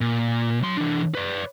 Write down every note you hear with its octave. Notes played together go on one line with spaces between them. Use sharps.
A#2
F#3 C6
E3 D4
B4 D5